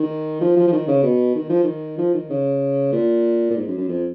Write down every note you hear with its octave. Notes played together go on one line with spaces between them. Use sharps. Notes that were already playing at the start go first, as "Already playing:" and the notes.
Already playing: D#3
F3
F3
F3
D#3
C#3
B2
D#3
F3
D#3
F3
D#3
C#3
A#2
A#2
G#2
F#2
F#2
F2